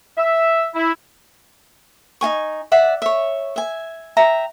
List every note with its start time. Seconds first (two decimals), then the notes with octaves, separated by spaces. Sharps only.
0.17 E5
0.74 E4
2.21 D#4 F4 G#5 C#6
2.72 D5 E5 F#5
3.02 C#5 E5
3.56 E5 G#5
4.17 E5 G5 A#5